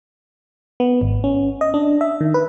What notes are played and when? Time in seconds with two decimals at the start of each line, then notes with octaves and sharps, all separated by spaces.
0.80 B3
1.01 G#1
1.24 C#4
1.61 D#5
1.74 D4
2.01 E5
2.21 D#3
2.34 B4